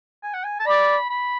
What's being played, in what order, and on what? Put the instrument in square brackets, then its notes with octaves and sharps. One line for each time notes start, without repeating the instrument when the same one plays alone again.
[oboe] G#5
F#5
G#5
A5
[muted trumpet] D5 [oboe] B5
[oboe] B5